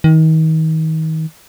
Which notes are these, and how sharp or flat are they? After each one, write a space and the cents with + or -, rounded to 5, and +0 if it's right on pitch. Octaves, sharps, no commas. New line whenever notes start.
D#3 +35